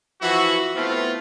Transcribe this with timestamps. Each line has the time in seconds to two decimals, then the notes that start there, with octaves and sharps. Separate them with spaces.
0.21 E3 F3 E4 F#4
0.76 A3 B3 C4 E4 F4